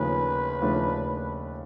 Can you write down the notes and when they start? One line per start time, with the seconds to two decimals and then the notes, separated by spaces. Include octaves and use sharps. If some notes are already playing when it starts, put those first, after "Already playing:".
Already playing: D#2 C#3 F3 A3 D4 B4
0.61 D#2 C#3 F3 A3 D4